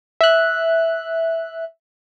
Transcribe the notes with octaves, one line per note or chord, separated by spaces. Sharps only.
E5 F#6